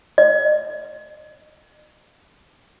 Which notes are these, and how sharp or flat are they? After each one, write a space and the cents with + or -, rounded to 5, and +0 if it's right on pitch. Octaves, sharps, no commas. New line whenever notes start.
D#5 -40